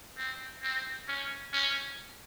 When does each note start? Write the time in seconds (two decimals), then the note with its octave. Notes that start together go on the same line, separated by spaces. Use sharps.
0.17 C4
0.63 C4
1.08 C#4
1.53 C#4